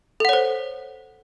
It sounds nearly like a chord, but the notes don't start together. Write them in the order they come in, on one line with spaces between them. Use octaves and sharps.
A4 F#5 C#5 C5